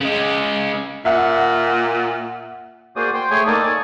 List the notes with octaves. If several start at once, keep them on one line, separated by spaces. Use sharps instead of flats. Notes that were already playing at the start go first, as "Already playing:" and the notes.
C#3 G#3
A#2 E5 F#5
A#3 F#4 G#4 C5 D5 D#6
C5 G5 C6
A3 G#4 C#5 G5 G#5
A#3 D#4 A4 D5 A5 D#6
C#5 D5 G#5 A5